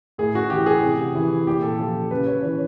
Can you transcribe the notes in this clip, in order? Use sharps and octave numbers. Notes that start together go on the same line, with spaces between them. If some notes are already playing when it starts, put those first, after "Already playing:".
A2 G#4
F#4
E3 G4
G#4
C3
E3
A#2 G4
A4
F3 A4
C#3 B4
C#5
E3 C#5